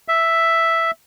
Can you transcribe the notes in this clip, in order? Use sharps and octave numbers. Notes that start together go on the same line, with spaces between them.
E5